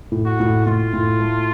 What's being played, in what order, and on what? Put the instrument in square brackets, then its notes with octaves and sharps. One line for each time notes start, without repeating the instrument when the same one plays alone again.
[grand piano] A2
[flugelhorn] F#4
[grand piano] A2
[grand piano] A2 [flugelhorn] F4
[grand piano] A2
A3